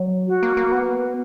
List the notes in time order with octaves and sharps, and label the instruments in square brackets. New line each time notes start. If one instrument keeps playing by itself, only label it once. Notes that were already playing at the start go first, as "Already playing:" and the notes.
Already playing: [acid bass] F#3
[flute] F#4
[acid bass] A#3
A#3
B3